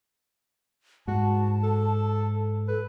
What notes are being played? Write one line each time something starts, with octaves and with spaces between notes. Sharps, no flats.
G#2 F#4 A5
A4
A4 B4